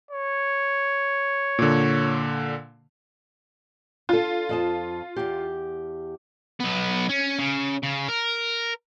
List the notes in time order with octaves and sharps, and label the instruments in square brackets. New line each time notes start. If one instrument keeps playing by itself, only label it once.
[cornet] C#5
[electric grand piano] A#2 D3
[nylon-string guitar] D4 A4 [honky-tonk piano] F4
[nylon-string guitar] F2 D#5 A5
E2 G4
[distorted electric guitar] B1 B3
C#4
C#3
C#3
A#4